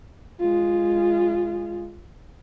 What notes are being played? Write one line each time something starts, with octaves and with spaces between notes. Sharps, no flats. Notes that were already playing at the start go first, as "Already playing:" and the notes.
G#3 F4